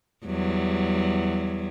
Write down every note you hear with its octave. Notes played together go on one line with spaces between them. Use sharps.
E2 F#3 G3